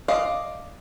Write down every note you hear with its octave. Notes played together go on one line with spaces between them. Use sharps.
D5 D#5 F5